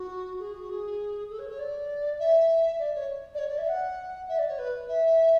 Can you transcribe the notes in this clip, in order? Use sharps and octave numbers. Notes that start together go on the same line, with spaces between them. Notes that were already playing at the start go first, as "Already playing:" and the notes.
Already playing: F#4
G#4
F#4
G#4
A4
C#5
C#5
D5
E5
D5
C#5
D5
C#5
D5
E5
F#5
E5
D5
C#5
B4
E5